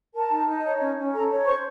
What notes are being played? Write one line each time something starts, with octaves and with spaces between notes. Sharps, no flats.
A#4 A5
D#4
D#4
C#5
C#4
C#4
A4 A#5
C#5
C5 C#6